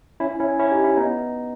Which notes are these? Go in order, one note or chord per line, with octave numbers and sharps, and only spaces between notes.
C#4 E4
C#4 E4
C#4 E4
D#4 G4
C#4 E4
B3 D#4